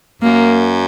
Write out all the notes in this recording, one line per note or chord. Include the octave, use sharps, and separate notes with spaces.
F#2 A#3